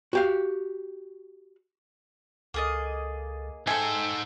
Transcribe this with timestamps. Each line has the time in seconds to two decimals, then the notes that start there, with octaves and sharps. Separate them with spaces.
0.13 F#4 G4 F5
2.54 C#2 A#3 G#4 A4 D#5 A6
3.67 G#2 A4 C5 E5 G5 G#5